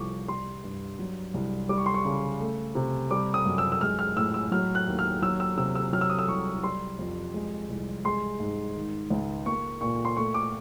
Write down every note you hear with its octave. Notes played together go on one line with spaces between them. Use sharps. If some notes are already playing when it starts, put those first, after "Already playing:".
Already playing: C2 F3 C#6 D6
G3 C6
G2
F#3
C2
G3 D6
C#6
C6
C#6
C#3
A3
C3
G3 D6
D#6
F#2
E6
E6
G#3 F6
F6
A2 E6
E6
F#3 F6
F#6
D#2
F6
F#3 E6
E6
C3 E6
E6
F#3 F6
E6
D#6
E6
C2 C#6
G3 C6
F2
G#3
C2
G#3 C6
G#2
D#3
C#2
A#3 C#6
A#2 C#6
C6
A3 C#6
D6